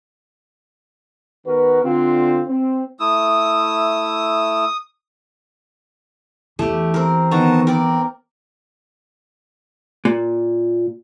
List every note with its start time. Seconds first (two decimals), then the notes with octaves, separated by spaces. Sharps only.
1.46 D#3 B3 F#4 A#4 B4
1.84 D3 C4 F4
2.48 C4
3.00 A3 E4 D#6 E6
6.59 E2 E3 A3 G4
6.94 C4 A#4
7.31 D#3 B3 F#4 A5 A#5
7.67 C4 A#4 D5
10.05 A#2